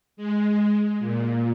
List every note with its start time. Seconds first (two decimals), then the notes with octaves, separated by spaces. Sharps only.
0.17 G#3
0.99 A#2